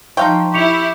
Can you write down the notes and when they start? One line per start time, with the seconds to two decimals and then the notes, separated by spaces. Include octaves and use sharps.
0.17 F3 D#4 F5 G5 A5 C6 C#6
0.54 E4 G4 C#6 C#7 F7